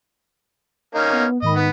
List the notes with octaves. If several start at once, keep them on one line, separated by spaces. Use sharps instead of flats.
A#3 C#4 D#4
B3
G#2 D#3 D#5 B5
B3